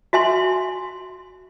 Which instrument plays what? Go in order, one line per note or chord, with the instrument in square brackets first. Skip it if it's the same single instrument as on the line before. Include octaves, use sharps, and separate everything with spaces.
[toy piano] F#4 E5 G#5 C6